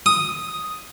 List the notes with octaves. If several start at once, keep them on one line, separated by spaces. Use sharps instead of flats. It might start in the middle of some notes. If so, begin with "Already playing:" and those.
D#6